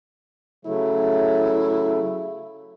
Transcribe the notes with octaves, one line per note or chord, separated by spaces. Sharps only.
C#3 F#3 A3 E4